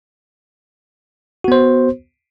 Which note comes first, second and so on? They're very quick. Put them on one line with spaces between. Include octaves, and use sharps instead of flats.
F#4 B3 C5